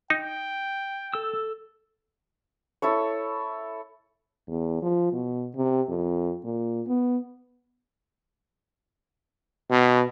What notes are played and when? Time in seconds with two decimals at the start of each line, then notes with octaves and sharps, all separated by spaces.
0.10 D#4 G5
1.14 A4 E6
2.82 E4 A4 C#5
4.48 E2
4.82 F3
5.12 B2
5.56 C3
5.89 F2
6.44 A#2
6.87 B3
9.70 B2